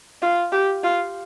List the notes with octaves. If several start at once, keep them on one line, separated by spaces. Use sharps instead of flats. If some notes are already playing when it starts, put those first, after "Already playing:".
F4
G4
F4